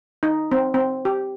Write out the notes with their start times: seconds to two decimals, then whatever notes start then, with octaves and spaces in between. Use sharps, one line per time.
0.23 D#4
0.52 C4
0.74 C4
1.05 G4